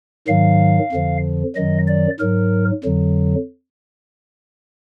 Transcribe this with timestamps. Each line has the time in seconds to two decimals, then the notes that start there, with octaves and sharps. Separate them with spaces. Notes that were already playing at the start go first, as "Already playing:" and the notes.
0.27 G#2 D#3 F#3 F5
0.92 F2 D3 F3
1.56 F#2 D#3 F#3 D#5
1.88 D5
2.19 G#2 F#3 A#4
2.84 F2 D3 F#3